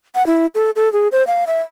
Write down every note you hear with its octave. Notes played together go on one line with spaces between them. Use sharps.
F#5
E4
A4
A4
G#4
C5
F5
E5